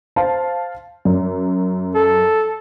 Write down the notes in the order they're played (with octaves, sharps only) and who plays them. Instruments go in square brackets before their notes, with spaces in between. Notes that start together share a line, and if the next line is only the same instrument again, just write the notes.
[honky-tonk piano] C5 F5 A5
F#2
[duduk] A4